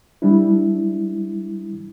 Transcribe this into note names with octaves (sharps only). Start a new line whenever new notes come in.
G3 D4 E4